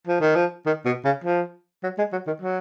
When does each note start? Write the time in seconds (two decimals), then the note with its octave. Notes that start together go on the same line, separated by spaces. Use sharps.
0.07 F3
0.21 D#3
0.36 F3
0.66 D#3
0.85 B2
1.05 C#3
1.24 F3
1.83 F#3
1.98 G#3
2.12 F#3
2.27 D#3
2.41 F#3